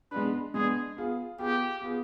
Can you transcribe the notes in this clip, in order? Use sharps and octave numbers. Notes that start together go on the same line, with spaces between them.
G#3 B3 D4 B4
G#3 B3 D4 G#4
B3 F4 G#4
B3 F4 G4 G#4
B3 F4 G#4